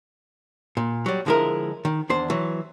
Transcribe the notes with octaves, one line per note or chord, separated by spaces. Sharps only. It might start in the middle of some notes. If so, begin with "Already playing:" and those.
A#2
F#3 G3
D3 F3 G#3 E4 A#4
D#3
E2 D4 C5
E3 F#3